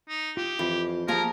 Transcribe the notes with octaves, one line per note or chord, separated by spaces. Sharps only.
D#4
F4 G4
F2 E3 F4
F3 A#3 F4 G4 G#4 A#4 A#5